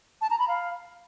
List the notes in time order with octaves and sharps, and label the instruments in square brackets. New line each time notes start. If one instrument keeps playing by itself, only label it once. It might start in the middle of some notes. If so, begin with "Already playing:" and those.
[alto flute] A5
A#5
B5
F5